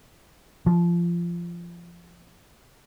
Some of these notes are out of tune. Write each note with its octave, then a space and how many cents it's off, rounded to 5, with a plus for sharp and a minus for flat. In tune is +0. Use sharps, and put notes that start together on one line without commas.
F3 -20